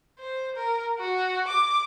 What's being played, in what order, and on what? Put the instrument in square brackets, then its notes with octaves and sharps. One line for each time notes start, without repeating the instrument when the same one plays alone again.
[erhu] C5
A#4
F#4
D6